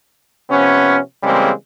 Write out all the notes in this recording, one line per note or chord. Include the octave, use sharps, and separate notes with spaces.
C3 F3 B3 C#4
C#3 E3 G3 G#3 A#3 C4